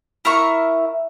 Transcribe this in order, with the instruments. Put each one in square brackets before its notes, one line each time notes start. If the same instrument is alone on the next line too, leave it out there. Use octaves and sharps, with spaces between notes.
[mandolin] E4 A#4 E5 C#6